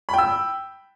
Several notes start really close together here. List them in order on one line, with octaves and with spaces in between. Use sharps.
B5 G5 E6